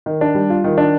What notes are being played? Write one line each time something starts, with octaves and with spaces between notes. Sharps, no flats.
D#3
D4
G3
F4
D#3
D4